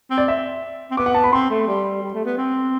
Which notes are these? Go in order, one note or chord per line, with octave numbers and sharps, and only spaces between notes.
C4
D5
E5
C4
B3 D6
F#5
A5
B5
C4 C6
A3
G3
G3
A3
B3
C4